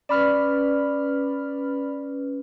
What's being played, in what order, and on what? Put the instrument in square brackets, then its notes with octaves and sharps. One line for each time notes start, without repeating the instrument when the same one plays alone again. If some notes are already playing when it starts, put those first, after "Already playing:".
[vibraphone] C#4 B4 [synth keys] D5 B5 F6